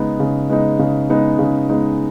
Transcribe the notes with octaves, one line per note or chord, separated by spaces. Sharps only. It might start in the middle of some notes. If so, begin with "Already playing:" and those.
Already playing: C#3 G#3 B3 D#4
C#3
G#3 B3 D#4
C#3
G#3 B3 D#4
C#3
G#3 B3 D#4